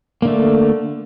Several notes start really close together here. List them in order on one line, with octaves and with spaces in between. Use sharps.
A#3 D3 A3